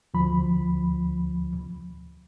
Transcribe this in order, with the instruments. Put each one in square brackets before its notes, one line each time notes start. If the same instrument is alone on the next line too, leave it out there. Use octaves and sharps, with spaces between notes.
[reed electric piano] D2 F3 B5